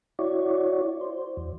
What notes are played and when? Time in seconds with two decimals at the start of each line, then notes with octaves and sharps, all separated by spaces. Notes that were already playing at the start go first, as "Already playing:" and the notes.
0.19 E4 F#4 C#5 D5
1.01 C5
1.37 E2